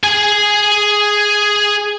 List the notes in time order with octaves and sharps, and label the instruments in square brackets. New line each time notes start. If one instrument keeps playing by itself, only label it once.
[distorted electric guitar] G#4 G#5